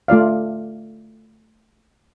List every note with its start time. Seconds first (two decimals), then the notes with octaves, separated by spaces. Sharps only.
0.08 A3 F4 D5 F5